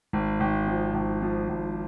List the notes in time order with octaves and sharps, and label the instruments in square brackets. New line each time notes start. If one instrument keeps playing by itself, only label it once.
[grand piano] G#1
G#1
F3
G#1
F3
G#1